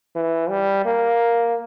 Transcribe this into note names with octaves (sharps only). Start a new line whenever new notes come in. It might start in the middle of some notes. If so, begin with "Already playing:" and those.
E3
G3
A#3